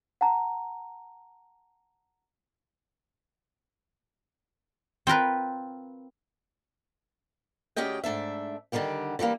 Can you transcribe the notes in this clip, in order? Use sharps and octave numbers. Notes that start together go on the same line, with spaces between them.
F#5 A5 A#5
C4 F4 A#4 B4
D2 C#4 G4 G#4 D#5 G5
G#2 A3 D4 E5
D3 D#3 G3 A#3 G4
D3 E3 G3 A#3